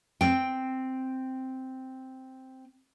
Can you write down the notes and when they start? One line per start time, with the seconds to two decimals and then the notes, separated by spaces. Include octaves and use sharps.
0.21 C4 G5